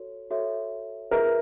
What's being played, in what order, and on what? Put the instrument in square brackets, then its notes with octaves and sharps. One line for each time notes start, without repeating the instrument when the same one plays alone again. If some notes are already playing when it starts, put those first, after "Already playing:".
Already playing: [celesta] F#4 A4 C#5
F#4 A4 C#5 E5
[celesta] F4 G#4 B4 E5 [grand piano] A#4